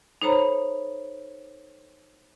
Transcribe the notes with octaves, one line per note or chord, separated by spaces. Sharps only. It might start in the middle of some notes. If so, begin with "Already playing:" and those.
D#4 A4 C5 C#5 A#5 B5